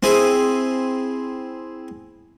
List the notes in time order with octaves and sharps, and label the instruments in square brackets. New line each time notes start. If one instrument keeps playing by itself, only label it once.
[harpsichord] C4 E4 G#4